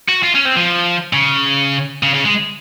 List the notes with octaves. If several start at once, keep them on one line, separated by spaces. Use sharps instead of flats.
F#4
F4
C#4
C4
F3
C#3
C#3
C#3
G#3